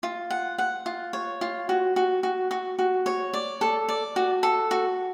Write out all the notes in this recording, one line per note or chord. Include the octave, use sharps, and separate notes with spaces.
F4
F#5
F#5
F4
C#5
F4
F#4
F#4
F#4
F#4
F#4
C#5
D5
A4
D5
F#4
A4
F#4